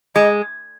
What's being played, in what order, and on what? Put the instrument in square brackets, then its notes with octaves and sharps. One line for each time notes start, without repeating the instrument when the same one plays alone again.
[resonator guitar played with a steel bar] G#3 [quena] D#5